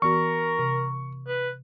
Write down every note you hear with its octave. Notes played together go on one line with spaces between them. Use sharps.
E3 B3 F#4 A#4 C#6
C3
B4